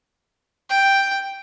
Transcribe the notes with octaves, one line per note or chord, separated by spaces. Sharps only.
G5